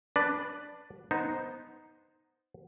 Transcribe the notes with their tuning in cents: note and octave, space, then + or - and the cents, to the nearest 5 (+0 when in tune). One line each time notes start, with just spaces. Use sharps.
D4 +0 B4 +0 D5 +5
B3 +0 D#4 +0 C5 +0